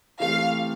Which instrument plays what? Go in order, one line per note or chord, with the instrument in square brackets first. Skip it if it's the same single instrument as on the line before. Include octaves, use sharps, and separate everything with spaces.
[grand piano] E3 A3 C4 G4 [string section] F5